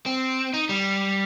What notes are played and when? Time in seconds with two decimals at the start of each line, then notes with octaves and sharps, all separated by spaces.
0.06 C4
0.54 D#4
0.69 G3